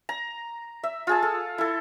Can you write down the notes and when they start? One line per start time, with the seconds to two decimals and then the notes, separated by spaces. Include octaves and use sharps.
0.09 A#5
0.83 E5
1.07 F4 G#4 A5
1.22 A4
1.58 E4 A4